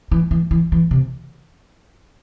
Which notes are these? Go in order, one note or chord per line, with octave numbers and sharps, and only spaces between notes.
E3
E3
E3
E3
C3